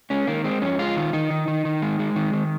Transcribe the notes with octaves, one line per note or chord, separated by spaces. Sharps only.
G#3 C#4
D#3 A#3
G#3 C4
F2 C#4
G#3 F4
D#3
D#3 D#4
D#3
D#3
D#3
G#3
G#3
D#3
D#3